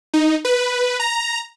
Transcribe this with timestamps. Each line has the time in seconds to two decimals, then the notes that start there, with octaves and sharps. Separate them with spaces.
0.14 D#4
0.45 B4
1.00 A#5